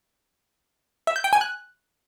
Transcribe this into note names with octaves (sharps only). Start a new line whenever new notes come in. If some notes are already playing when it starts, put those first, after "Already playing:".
E5
G6
G5
G#5
F#6